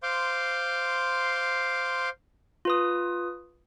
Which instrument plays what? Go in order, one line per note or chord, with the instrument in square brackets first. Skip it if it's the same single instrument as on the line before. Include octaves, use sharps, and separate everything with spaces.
[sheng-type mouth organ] C5 F5 C6 D6
[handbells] F4 B4 D#6